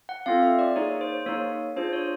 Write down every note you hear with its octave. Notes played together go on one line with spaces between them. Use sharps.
F#5
C4 F4 A4 F5
E5
D5
A#3 D#4 G#4 C#5
C5
A#3 D#4 G#4 C#5
D4 F4 G#4 C5
C#5